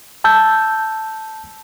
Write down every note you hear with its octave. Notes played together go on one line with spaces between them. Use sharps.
A5 E6 G6